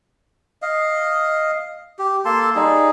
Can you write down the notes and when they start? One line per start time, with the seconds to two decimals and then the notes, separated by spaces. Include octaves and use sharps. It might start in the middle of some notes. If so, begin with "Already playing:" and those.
0.62 D#5 F5
1.99 G4
2.25 A#3 A4 A5 C6
2.55 G3 D#4 G#4